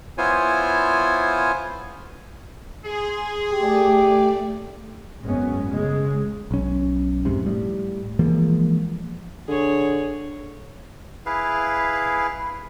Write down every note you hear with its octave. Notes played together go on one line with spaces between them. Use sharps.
B3 E4 F4 C5 C#5 G#5
G#4 G#5 C6
A3 G4 D5
G#1 F#2 G#3 B3 C#4
C#3 G#3
B1 C#4
C2 F2 G#2 C3
A2 G3
E3 F3 G#3 A#3
D3 G#4 C#5
E4 G#4 B4 F5